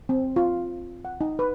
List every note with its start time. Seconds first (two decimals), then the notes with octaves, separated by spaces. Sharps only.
0.09 C4
0.36 F4
1.05 F#5
1.21 D#4
1.39 B4